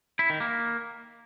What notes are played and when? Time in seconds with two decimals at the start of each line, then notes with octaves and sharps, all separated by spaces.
0.19 E4
0.30 D#3
0.40 A#3